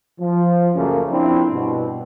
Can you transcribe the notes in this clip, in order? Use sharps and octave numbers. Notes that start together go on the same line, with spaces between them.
F3
C#2 F#2 C#3 A3 A#3 C#4
F3 C4 D4 E4
G2 B2